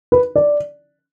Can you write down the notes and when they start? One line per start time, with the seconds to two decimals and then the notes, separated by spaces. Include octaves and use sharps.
0.12 B4
0.36 D5